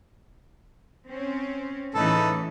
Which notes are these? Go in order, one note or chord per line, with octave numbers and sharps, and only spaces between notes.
C4 C#4
A2 C#3 E3 D#4 A4 B4